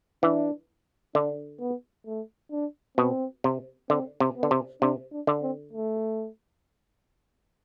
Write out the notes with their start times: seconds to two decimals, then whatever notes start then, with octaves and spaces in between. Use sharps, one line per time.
0.23 E3 D4
1.15 D3 D4
1.60 B3
2.07 A3
2.52 D4
2.98 B2 C4
3.44 C3
3.90 D3 C4
4.20 C3
4.36 B3
4.43 D3
4.51 C3
4.82 C3 D4
5.12 D4
5.27 D3
5.42 C4
5.73 A3